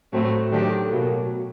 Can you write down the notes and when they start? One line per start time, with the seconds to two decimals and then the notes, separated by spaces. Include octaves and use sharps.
0.12 A2 F#3 A3 C4
0.51 D#3 F#3 A3 D4 G4
0.89 B2 F#3 A#3